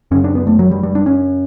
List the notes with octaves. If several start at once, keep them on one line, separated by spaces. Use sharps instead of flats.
F#2 C#3 C#4
D4
B3
A3
F#3
G3
G3
D4
C#4